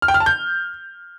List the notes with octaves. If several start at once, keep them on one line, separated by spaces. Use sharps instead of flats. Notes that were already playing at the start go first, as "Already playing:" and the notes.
F6
G5
F6
A5
G6